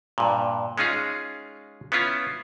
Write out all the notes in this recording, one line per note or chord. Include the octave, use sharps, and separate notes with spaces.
G2 A#2
G#3 C#4 D#4 F4 G#4
B3 C#4 E4 F4